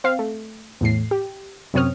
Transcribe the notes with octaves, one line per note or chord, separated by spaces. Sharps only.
C4 F5
A3
E2 A2 C7
G4
F#2 C3 C4 C#5 D#6 F6